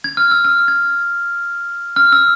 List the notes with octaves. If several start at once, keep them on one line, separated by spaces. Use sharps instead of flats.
G#6
F6
E6
F6
G#6
F6
E6